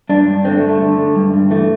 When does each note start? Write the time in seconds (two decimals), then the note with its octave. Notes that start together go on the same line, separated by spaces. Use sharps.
0.09 G2 D4
0.27 G2
0.45 D3 C4
0.57 A3
0.62 G2
0.69 A3
0.81 D3
0.98 D3
1.15 G2
1.34 G2
1.50 E3 A3